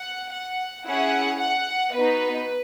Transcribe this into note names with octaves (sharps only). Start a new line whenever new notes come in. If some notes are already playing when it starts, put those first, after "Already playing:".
Already playing: F#5
F#5
C#4 E4 G#4 F#5
F#5
B3 D#4 F#4 B4